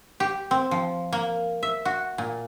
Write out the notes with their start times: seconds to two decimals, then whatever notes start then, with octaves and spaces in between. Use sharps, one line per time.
0.20 G4
0.51 C4
0.71 F3
1.13 A#3
1.63 E5
1.85 F#4
2.18 A#2